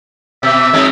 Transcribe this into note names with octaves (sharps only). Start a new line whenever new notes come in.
B2 E5
F2 G#3 D#4